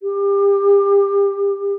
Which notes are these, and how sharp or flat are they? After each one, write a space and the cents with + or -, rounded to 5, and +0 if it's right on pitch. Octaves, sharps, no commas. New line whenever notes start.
G4 +30